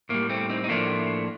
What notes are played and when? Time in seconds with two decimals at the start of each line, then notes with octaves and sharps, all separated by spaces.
0.09 A2 G3 A#3
0.29 A3 C4
0.49 C4 D#4
0.64 D#4
0.69 A2 F3 A3 A#3 D4